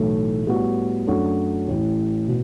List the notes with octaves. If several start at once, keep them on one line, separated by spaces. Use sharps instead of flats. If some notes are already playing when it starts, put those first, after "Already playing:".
Already playing: B1 A2 E3 A3
A2 G3 B3 F#4
F#2 F#3 A3 D4 F#4
A1 A2 E3
B2